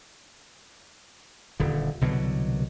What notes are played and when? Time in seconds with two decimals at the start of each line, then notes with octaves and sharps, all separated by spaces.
1.60 D#1 D3
2.01 C2 B2 D3 F#3